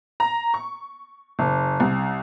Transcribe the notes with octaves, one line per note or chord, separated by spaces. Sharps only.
A#5
C#6
F#1
C2